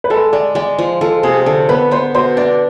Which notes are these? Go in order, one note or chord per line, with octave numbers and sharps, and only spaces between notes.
B4
G#3 A4
G#3 D5
G#3 D5
F3
F3 A4
C3 G#4
G#4
D3 A4
B3 B4
B3 C5
B2 C5
D4 D5